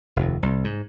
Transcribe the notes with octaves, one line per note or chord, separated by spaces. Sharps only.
F1 D#2
C2
G#2